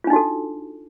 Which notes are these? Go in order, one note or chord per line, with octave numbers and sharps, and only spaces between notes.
D4 D#4 F4 F#4 A4